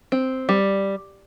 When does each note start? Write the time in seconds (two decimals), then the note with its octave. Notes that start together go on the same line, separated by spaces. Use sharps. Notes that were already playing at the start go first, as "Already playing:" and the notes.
0.12 C4
0.49 G3